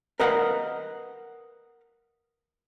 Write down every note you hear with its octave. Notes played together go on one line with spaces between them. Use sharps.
A#4 B4 D#5 F5 F#5